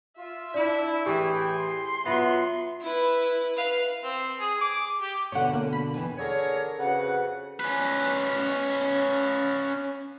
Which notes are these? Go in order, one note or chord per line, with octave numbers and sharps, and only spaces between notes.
F4 E5
D4 E4 D5
A2 E3 G4 G#4 G5
C6
F#3 B3 F4 E5
E4 B4
B4 F5
C4
G#4
D6
G4
B2 D3 C#5 F#5
A#3
B5
D#2 E3 G#5
D3 G#4 A#4 C#5
F2 C#3 F#4 B4 F#5
C#4 B4